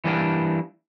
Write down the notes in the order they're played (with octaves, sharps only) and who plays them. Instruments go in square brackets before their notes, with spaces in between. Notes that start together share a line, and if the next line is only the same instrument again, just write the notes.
[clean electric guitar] E3 G3 A#3 D4